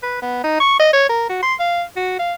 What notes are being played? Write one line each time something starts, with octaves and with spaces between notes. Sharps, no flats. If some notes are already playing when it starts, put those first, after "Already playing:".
B4
B3
D#4
C#6
D#5
C#5
A#4
F#4
C6
F5
F#4
F5